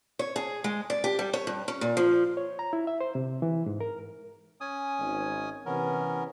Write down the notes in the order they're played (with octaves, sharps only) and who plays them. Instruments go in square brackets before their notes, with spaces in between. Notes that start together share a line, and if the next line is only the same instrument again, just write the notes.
[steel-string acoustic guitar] C#5
G#4
G#3
D5
G4
G3
C#5
G2
C#4
A#2
F3
[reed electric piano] C#5
A#5
E4
E5
C5
C3
E3
G#2
A#4
[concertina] C#4 G#5 D#6
[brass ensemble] G#1
[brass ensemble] C3 E3 [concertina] B3 C#4 A#4